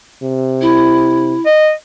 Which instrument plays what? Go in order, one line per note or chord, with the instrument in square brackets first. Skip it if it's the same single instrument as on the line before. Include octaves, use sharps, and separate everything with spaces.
[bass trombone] C3
[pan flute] E4
[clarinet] D#5